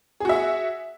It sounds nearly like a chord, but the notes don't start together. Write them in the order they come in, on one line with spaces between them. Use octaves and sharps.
G#4 F#4 E5